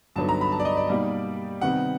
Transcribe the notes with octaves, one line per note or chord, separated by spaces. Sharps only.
G2 D3 F#3 B3 D#4 A5
A#5
B5
A5
D5
D#5
D5
B2 G3 A#3 D#4
C3 D#3 G3 B3 F#5